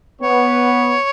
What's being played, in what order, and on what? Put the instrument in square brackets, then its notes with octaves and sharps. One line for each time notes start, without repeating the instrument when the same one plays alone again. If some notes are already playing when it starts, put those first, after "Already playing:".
[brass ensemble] B3 [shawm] C#5